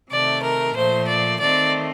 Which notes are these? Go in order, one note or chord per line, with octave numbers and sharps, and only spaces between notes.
C3 D#3 A3 D5
A#4
A#2 F3 A3 C5
D5
D#3 A3 C4 D5